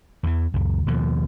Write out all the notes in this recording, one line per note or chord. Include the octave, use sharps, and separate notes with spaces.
E2 E3
C#2 F#2
D#2 B2 F3